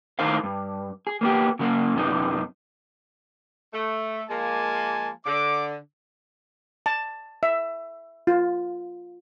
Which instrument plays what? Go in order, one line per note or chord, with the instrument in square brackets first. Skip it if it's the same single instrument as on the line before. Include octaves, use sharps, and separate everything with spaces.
[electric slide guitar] A2 D#3 D#4 A#4 C5 F5
G2
G#4
A#3 B3 G4
C#3 F#3 A#3
F#2 C3 B3 D#4
[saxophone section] A3
[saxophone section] F3 G#3 A#3 [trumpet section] G#5 A5
[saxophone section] D3 [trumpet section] D6
[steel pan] A5
E5
F4